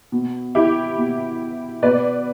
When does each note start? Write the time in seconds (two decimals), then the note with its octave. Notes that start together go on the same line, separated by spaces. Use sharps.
0.12 B2
0.55 E4 G4
0.98 B2
1.83 B2 B4 D5